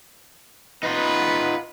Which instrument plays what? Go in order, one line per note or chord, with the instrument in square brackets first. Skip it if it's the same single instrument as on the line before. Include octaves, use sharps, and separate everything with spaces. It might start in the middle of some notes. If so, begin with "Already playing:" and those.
[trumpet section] B3 B4 [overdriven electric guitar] D#4 F4